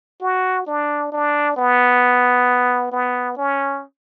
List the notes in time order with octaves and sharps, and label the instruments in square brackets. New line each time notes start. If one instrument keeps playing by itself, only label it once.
[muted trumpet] F#4
D4
D4
B3
B3
C#4